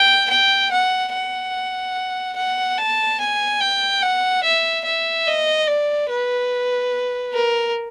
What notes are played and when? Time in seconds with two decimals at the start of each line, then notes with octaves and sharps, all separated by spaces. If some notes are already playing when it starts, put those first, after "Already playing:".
Already playing: G5
0.30 G5
0.72 F#5
1.13 F#5
2.37 F#5
2.78 A5
3.20 G#5
3.61 G5
4.03 F#5
4.44 E5
4.85 E5
5.27 D#5
5.67 D5
6.10 B4
7.34 A#4